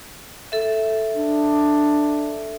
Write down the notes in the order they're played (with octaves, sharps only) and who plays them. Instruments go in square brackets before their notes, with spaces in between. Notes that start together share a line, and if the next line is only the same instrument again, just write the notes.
[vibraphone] A4 E5
[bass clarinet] D4